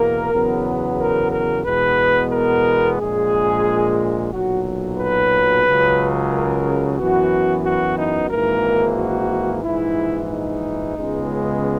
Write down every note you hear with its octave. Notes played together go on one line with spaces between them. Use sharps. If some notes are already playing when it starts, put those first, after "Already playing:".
Already playing: E2 B2 A#3 A#4
E2 C#3 F#3 B3
A#4
A#4
E2 B2 G#3 B3 B4
A#4
A#1 A#2 G#3 G#4
B1 A#2 F#3 F#4
B4
C#2 C#3 F#3
A#4
F#2 E3 B3 F#4
F#4
D#4
G#1 G#2 E3 A#3 A#4
F#4
A#1 G#2 E3 E4
D#4
C#2 C#3 G#3 B3